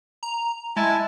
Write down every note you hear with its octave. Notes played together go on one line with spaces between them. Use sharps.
A#5
G#3 E4 G#5 A5